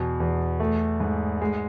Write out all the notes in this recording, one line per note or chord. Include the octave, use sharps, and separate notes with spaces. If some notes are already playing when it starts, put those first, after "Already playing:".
Already playing: E2 B2
E2
A3
G#2
G#3